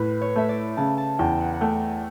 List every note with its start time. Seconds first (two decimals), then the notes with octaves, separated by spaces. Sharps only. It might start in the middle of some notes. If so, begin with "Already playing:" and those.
Already playing: A2 B4
0.21 C#5
0.36 A3 E5
0.49 D5
0.77 C#3 A5
0.97 A5
1.19 E2 G5
1.40 F#5
1.54 F#5
1.61 A3 G5